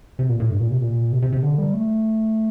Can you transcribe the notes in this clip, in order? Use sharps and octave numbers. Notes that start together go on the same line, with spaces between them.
C3
A#2
A2
G2
A#2
C3
A#2
C3
C3
C3
D3
G3
A3